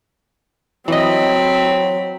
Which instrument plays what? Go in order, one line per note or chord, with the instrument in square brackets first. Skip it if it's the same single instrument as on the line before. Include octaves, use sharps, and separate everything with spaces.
[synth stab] E3 D#5 [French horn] F#3 [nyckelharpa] C4 B5